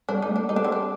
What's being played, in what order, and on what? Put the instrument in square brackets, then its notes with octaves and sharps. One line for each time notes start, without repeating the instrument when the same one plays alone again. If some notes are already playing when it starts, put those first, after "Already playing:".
[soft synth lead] G3 [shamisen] D4
[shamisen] D#4
[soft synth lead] A3
[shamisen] D4
[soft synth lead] A#3
[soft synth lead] G3 [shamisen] D#4
[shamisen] D4
C4
D4